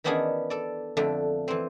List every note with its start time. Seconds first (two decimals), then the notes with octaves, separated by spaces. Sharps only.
0.04 D#3 E3 B3 C#4 D4 G#4
0.50 A4 D5
0.97 F2 D3 A3
1.48 E3 C4